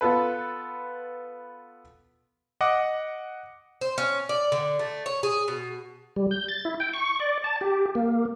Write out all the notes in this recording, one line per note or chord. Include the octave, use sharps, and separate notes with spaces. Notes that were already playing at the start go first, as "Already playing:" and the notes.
B3 F4 A4 B4
D#5 F#5 D6
C5
C#4
D5
D3
A3
C#5
G#4
B2
G3
G6
A6
E4
G5
C#6
D5
A5
G4
A#3